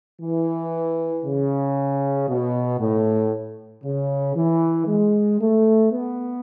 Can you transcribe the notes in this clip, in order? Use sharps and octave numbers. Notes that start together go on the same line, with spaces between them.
E3
C#3
B2
A2
C#3
E3
G#3
A3
B3